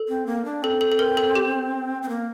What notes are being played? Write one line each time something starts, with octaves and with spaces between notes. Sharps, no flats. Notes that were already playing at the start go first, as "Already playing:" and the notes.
Already playing: A4
C4
A#3
D4
C4 A4
A4
A4
A#4
A4
G4
C4
A#3